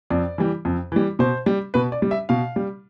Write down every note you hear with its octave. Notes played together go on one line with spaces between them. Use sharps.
F2 D5
E3 G3
F2
E3 G3
B2 C5
G3
B2 B4
D5
G3
E5
B2 F5
G3